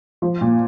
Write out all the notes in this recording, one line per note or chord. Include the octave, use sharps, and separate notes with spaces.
F3
A#2